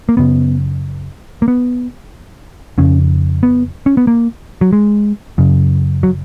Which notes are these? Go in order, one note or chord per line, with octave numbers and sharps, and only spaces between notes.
A#3
F#2 C#3 B3
A#3
B3
F2 C#3 C#4
B3
C#4
B3
A#3
F#3
G#3
F#2 C#3
F#3